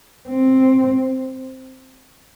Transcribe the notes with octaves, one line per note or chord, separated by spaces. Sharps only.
C4